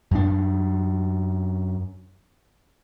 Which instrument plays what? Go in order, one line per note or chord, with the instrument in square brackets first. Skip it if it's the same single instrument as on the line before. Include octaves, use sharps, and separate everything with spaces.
[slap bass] F#2 D4